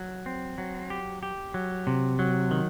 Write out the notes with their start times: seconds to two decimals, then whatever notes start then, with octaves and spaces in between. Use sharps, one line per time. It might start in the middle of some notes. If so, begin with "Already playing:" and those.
Already playing: F#3
0.26 C4
0.58 F#3
0.90 G4
1.23 G4
1.54 F#3
1.87 C3
2.19 F#3
2.51 D#3